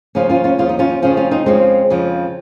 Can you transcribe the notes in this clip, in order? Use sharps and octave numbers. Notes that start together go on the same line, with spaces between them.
D#2 C#3 F3 C#4 F4
C#4 F4
C#4 F4
D#2 C#3 F3 F4
D#4
C#4 F4
F2 C#3 F3 C#4 F4
C#4 F4
C4 D#4
F2 C#3 F3 G#3 C4
F2 C#3 F3